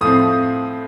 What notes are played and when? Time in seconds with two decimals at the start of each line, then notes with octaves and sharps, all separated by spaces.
0.01 A2 F3 A3 C4 D#6